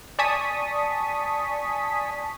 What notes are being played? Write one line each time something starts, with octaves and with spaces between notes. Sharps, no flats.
D5 G#5 A5 C#6 D#6 B6